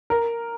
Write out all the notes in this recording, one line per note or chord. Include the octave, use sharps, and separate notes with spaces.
A#4